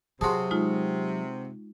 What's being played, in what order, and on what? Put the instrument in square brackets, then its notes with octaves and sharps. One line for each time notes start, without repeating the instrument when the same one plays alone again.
[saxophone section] C3 [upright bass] F#3 [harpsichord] F#4 G#4 [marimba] A5 C6
[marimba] G#3 D#4 F4